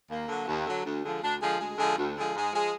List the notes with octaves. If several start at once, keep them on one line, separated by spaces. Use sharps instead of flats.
D#2 A#3
D3 F#3
D#2
D3 F#3
D2
D3 F3 G#3
D2 D4
D3 F3 G#3
D2 G#3
D3 F3 G#3
D2
D3 F3 G#3
G#2 G#3
F3 G#3